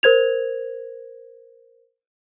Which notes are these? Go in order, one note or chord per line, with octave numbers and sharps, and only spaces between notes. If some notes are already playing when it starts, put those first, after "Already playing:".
A#4 C5 G#6 F7